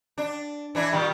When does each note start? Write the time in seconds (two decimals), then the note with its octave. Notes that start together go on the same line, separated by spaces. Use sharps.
0.18 D4
0.75 E3 D4 E4
0.92 A#2 D#3 G3